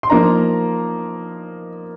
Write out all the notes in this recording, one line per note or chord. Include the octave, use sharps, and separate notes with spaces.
C6
F3 A#3 D#4 A#5